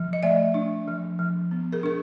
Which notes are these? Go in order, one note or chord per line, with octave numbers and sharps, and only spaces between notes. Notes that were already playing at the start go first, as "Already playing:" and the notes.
Already playing: F3
D#5
A3 D5 E5
D4
F3
F3
B3
G#4 A#4
D4 A#4